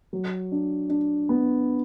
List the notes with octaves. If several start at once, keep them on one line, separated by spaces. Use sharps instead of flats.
F#3
D4
D4
B3